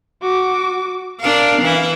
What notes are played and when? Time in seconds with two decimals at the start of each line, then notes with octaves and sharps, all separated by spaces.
0.22 F#4 D6
1.20 D4 A#4 F5
1.62 E3 E4